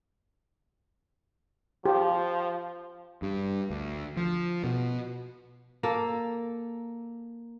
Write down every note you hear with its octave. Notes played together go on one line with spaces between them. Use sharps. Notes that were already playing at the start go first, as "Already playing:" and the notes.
F3 G4
G2
D2
F3
B2
A#3 A4